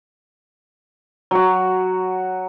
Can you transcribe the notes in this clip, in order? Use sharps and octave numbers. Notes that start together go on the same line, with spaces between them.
F#3 F#4